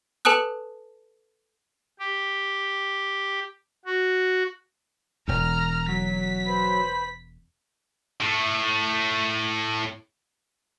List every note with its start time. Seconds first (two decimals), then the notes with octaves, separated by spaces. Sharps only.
0.25 A4 B4 G#5 A5 D#6 F#6
1.99 G4
3.85 F#4
5.28 E1 E2 A#5 F6
5.88 F#3 B6
6.46 B4 C5 B5
8.21 A2 A3